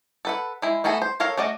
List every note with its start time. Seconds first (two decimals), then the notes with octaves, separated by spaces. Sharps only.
0.25 A4 B4 F#5
0.62 G#3 E4
0.84 A3 B3 F#4 G#4 A4
1.02 C5
1.20 A4 A#4 C#5 F5
1.37 A3 F#4 D5 D#5